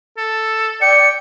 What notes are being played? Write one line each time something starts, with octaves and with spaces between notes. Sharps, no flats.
A4
D5 G5 C#7